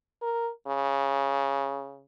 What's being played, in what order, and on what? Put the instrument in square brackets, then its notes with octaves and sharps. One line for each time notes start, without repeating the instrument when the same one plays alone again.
[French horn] A#4
C#3